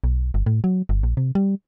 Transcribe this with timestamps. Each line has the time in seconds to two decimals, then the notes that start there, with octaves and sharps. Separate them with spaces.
0.04 B1
0.34 G1
0.46 A2
0.64 F#3
0.89 G1
1.03 A#1
1.17 C3
1.35 G3